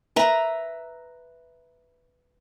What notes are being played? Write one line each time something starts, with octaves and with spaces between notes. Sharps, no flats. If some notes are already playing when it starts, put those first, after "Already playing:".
B4 E5 A#5